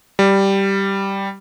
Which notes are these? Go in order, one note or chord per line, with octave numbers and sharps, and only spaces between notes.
G3